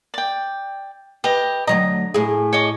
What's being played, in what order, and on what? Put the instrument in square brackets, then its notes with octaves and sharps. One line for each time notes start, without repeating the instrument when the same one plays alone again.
[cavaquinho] D5 G5
[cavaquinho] G4 D#5 [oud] B4
[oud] D2 F#3 D#5 [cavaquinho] A#5
[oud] A2 G#4
[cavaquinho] C#5 D#5 D6